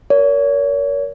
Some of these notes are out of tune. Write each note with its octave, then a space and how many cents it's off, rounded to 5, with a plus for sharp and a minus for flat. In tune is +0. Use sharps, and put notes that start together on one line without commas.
A#4 +0 C#5 +35